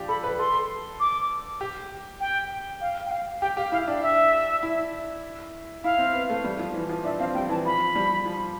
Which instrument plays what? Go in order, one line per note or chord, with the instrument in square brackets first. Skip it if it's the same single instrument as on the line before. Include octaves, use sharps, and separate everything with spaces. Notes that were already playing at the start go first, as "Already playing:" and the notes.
Already playing: [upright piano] F3 D4 F4 G4
[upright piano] A4 [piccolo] B5
[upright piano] B4
[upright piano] A4 [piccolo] C6
[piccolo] D6
[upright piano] G4
[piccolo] G5
F5
G5
F5
[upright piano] G4 [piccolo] G5
[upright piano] G4 [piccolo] F5
[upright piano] E4 [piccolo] F5
[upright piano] D4
[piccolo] E5
[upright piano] E4
[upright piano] E4 [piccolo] F5
[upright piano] C4
B3
A3
G3
F3
E3
F3
[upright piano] D4 [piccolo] E5
[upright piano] C4 [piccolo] F5
[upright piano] G3 [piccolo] G5
[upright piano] E3 [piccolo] A5
[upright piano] F3 [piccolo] B5
[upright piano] G3
F3